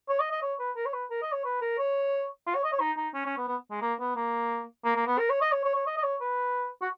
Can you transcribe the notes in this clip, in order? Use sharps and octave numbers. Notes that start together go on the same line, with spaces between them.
C#5
D#5
D#5
C#5
B4
A#4
C#5
B4
A#4
D#5
C#5
B4
A#4
C#5
F4
C#5
D#5
C#5
D#4
D#4
C#4
C#4
B3
B3
G#3
A#3
B3
A#3
A#3
A#3
B3
A#4
C#5
D#5
C#5
C#5
C#5
D#5
D#5
C#5
B4
F#4